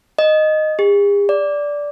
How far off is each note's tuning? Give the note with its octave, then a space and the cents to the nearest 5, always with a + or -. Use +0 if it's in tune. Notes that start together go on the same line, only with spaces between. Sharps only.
D#5 -5
G#4 -45
D5 -10